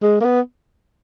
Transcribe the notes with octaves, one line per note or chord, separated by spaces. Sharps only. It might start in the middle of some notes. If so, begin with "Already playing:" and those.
G#3
A#3
B3